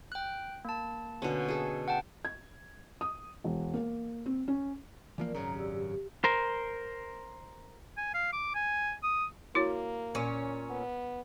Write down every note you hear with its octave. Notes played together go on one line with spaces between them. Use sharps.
G5 F#6
A#3 A5
B2 D3 C#4
G#4 A4
F#5 G5 A5
G#6
D#6
E1
A#3
C4
C#4
E3 F3 A#3 A#4 D5
G#1 F#2 C#3 A#5
G4 D5 E6
G4
A#4 C5
G#5
F5
D6
G#5
D#6
A#3 E4 F#4 C#5
A#2 C#4
B3